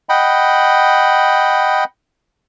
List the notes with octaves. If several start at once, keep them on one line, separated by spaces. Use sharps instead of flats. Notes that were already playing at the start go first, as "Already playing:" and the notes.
D#5 F#5 G5 B5